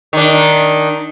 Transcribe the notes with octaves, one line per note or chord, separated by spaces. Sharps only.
D#3 D4